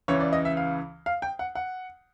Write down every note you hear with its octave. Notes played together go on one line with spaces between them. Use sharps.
C#2 C#3 E3 C#5
D5
D#5
E5
F5
F5
G5
F#5
F#5